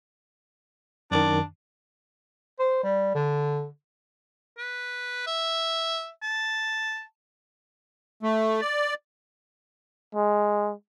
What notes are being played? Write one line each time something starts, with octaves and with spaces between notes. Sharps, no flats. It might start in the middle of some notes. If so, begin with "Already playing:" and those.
F#2 D#3 D4
C5
G3
D3
B4
E5
A5
A3
D5
G#3